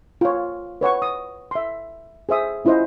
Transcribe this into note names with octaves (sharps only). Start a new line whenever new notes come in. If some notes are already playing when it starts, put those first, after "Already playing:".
F4 C#5
B4 C#5 F#5 C#6
D#6
E5 C6
G#4 C5 E5 D#6
C#4 E4 F4 C5 D#5